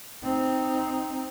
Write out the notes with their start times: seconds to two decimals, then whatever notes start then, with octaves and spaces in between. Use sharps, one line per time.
0.23 C4 D#4